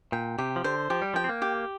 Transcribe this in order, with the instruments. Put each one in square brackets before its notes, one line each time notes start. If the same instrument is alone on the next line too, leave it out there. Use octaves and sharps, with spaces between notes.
[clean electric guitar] A#2 [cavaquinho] G5
[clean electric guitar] C3 [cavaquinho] G4
[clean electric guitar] F3
[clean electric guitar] D3 [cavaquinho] C5
[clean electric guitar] F3 [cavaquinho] G4
[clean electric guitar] G3
[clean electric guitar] F3 [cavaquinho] G5
[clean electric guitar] C4
A#3
[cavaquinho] G4